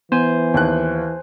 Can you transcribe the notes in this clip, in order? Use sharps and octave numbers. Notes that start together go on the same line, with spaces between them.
E3 B3 C5 G#5
D#2 F#6